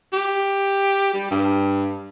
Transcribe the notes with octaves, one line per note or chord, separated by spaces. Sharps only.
G4
G3
G2